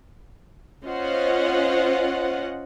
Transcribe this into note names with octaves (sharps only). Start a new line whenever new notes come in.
C#4 F4 C5 D#5 F#5